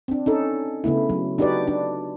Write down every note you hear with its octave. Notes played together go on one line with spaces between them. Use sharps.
C4 D4
C#4 D#4 A4
C#3 A3 B3 E4
F#3
D4 D#4 F#4 G4 B4 D5
D4